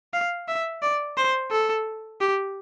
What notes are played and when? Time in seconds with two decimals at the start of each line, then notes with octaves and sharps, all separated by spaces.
0.14 F5
0.48 E5
0.82 D5
1.17 C5
1.51 A4
2.21 G4